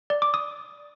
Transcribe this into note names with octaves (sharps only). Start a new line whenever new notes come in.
D5
D6
D#6